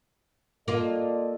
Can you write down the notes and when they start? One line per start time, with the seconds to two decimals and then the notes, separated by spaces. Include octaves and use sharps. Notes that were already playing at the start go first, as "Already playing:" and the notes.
0.68 A#3 F4 A4 D5 D#5